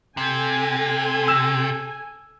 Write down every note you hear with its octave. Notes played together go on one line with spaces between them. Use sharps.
C3 A4 G#5
E6 E7